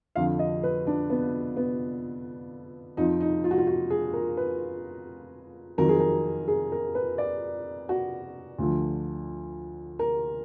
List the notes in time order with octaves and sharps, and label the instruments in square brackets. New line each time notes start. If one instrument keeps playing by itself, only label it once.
[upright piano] F2 D3 F3 F5
D#5
B4
D4
B3
B3
F2 F3 D#4
D#4
F4
F#4
F4
F#4
G#4
A#4
B4
F2 D#3 F#3 A#4
G#4
A#4
G#4
A#4
B4
D5
F#4
D2 D3 F3
A#4